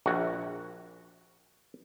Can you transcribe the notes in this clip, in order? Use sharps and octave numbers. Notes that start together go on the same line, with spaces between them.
A#1 F#4